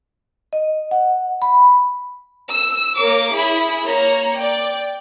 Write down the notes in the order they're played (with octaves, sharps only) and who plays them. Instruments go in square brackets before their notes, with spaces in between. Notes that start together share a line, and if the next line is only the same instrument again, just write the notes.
[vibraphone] D#5
F#5
B5
[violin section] E6
A#3 A#4 C#5 D6 C7
E4 G#4 B5
A#3 C#5 A#5
D5 G5